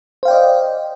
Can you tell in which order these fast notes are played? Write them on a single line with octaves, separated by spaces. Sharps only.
C5 F5 G5 D5 D#5